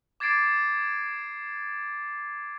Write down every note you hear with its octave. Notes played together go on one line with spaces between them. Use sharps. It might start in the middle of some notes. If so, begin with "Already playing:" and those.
D6 G#6 A6 C7 D7